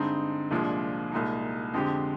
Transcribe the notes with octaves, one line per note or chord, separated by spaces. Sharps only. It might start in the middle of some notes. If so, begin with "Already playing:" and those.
Already playing: G2 D3 G#3 C4 D#4
C2 A#2 F3 G#3 D4
C2 A#2 G#3 D#4
F2 D3 G#3 C4 G4